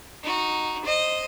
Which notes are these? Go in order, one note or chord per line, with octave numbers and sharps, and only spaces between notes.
D#4 F#4
C5 D#5